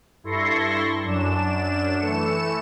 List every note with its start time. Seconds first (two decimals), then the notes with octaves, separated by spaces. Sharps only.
0.23 G2 E4 A4 C6 C#6 A#6
1.04 F#2 D4 E7
1.96 E3 A3 C#7 E7